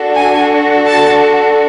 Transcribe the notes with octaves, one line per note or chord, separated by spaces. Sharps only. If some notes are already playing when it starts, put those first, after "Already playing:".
Already playing: D4 F#4 A4
G#5
A5